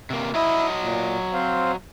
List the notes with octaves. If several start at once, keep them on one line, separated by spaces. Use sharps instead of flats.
C3 A#3
F#3 E4 D#5 E5
A#2
C4 C5 F5